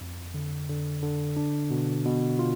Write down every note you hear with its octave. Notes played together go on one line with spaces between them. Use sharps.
F2
D3
D3
D3
D4
B2
B2
F4